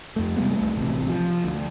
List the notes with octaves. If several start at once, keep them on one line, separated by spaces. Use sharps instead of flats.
F2 A3
C3 G3 G#3 B3
C2 A3
A1 C3
F3
D2